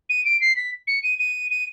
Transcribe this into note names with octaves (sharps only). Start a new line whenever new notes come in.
D#7
D7
C7
B6
C#7
D#7
D#7
D#7